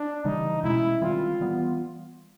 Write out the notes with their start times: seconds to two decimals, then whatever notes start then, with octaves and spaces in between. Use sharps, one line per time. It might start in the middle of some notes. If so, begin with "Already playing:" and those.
Already playing: D4
0.25 C#3 E3 G3 D#4
0.63 B2 G#3 C#4 E4
1.02 D#3 G3 C4 F4
1.40 E3 G3 B3